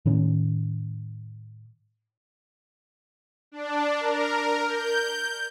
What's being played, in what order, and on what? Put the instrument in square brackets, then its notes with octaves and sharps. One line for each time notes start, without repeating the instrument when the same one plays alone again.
[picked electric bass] A2 D#3 C#4
[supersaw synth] D4
A#4
G6